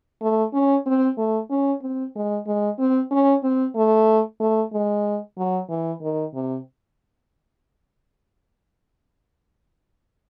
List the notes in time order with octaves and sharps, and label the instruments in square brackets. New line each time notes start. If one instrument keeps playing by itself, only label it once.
[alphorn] A3
C#4
C4
A3
C#4
C4
G#3
G#3
C4
C#4
C4
A3
A3
G#3
F#3
E3
D#3
C3